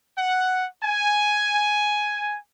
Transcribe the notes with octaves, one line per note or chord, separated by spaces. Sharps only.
F#5
G#5